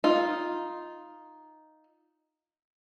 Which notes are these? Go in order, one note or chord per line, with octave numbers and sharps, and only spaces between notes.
D#4 F4